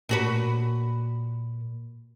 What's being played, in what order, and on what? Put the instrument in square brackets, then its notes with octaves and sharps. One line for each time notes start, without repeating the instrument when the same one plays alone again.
[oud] A#2 F#4 B4